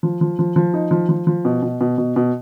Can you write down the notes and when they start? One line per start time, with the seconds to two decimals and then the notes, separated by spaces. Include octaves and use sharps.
0.03 F3
0.21 F3
0.39 F3
0.56 F3
0.74 D#4
0.91 F3
1.09 F3
1.27 F3
1.45 B2
1.63 B2
1.81 B2
1.98 B2
2.16 B2